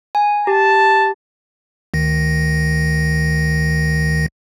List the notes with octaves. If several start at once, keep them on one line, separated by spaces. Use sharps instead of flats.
G#5
G4 A5
D2 D#3 A#6